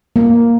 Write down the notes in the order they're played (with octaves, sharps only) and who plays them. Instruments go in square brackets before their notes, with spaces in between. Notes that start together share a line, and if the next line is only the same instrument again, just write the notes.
[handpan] A#3